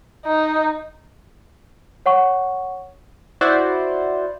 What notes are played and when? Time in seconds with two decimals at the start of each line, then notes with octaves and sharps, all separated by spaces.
0.25 D#4
2.06 C#5 F#5 C#6
3.41 E4 F#4 C5 D5